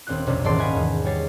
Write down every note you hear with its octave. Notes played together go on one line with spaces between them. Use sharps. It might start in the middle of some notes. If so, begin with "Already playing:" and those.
D#1 C4 D4 F4 F#6
F1 B1 C3 C#4 D4
D#1 G#2 E3 D5 A5 C6
D#5 F5 F#5 G#5 B5
E2 D#3
G3 C#5 A6 C7